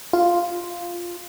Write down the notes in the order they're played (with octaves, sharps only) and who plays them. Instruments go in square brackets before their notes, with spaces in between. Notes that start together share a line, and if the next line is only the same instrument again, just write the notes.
[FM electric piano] F4